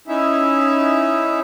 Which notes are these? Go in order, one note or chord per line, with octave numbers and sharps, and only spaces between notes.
C#4 D#4 E4 E5